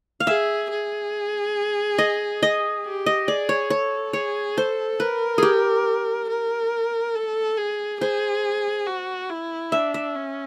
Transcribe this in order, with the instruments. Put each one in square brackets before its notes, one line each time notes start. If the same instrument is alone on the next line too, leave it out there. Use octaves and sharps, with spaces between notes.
[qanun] F5
[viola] G#4 [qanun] E5
[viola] G#4
[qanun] D#5
D#5
[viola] G4
[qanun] D#5
[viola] G#4 [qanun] D5
[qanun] C#5
[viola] A4 [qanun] C#5
[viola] G#4 [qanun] C#5
[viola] A4 [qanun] C5
[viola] A#4 [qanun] B4
[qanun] G4 G#4
[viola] A#4
A4
G#4
[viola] G#4 [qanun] C5
[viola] F#4
E4
[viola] D4 [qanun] E5
[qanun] E5
[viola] C#4